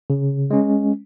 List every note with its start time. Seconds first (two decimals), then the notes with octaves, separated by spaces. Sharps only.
0.10 C#3
0.51 G#3 C#4